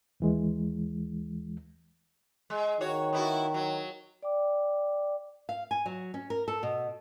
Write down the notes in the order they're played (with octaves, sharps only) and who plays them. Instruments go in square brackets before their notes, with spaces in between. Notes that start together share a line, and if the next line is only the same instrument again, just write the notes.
[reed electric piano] D#2 E3 G#3
[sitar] G#3
[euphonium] D#3 [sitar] F#4 C#5
[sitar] B3 E4 F#4
F#3
[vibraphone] D5 G5 D6
[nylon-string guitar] F5
G#5
F#3
C#4
A#4
A4
B2